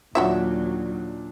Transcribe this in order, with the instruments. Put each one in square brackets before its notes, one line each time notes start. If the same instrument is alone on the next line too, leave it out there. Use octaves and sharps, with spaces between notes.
[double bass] D#2 F#3 [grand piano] A#2 D4 [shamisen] F#4 C#5 E5